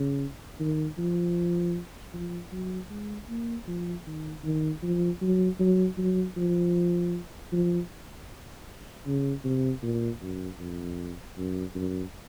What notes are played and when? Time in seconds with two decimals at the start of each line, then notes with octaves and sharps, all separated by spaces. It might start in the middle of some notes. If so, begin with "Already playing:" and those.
Already playing: C#3
0.60 D#3
0.98 F3
2.14 F3
2.52 F#3
2.90 G#3
3.29 A#3
3.67 F3
4.07 D#3
4.44 D#3
4.83 F3
5.22 F#3
5.60 F#3
5.98 F#3
6.37 F3
7.53 F3
9.07 C#3
9.44 C3
9.83 A#2
10.22 F#2
10.59 F2
11.37 F#2
11.75 F#2